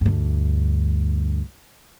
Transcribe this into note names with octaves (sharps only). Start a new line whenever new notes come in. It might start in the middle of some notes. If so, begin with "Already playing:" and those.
D2 G2